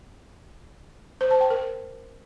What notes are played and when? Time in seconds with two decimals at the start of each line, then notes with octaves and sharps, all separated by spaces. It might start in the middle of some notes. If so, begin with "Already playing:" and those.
1.21 C5
1.31 A5
1.41 G5
1.50 A#4